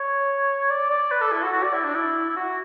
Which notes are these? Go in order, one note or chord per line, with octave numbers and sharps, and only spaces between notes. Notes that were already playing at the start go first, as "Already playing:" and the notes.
Already playing: C#5
D5
D5
B4
A4
E4
F#4
F#4
D5
E4
D4
E4
E4
F#4